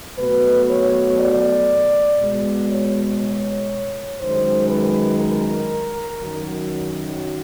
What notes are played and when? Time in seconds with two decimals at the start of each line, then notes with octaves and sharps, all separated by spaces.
0.18 B2 F#3 A3 B4
0.69 C#5
1.20 D5
2.20 B2 G#3
2.70 C#5
3.20 C#5
4.20 F#2 D#3 G#3 C5
4.70 B4
5.20 A#4
6.21 F#2 D#3 F#3